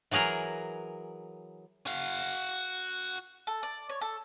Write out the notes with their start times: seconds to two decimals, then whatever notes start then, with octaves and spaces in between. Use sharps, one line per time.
0.11 E3 F#3 G#4 A#4 A#5
1.87 F#4 F5
3.47 A4
3.63 D5
3.89 C#5
4.01 A4